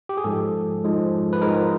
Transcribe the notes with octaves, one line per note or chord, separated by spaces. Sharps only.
G4
G#4
G#2 F3 G#3 A4
G#2 F3 G#3
B4
G#2 F3 G#3 A#4